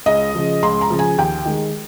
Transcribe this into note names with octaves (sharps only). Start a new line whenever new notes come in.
C#2 D#5
C#3 F3
C#2 C6
A#5
C#3 F3
G#5
D#2 G5
D#3 G#3